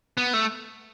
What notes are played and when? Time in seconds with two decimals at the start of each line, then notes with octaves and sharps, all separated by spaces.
0.17 B3
0.33 A3